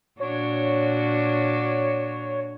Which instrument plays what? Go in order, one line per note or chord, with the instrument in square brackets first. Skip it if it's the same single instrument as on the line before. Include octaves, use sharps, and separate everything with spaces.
[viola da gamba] A#2 D4 F#4 [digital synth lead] C#5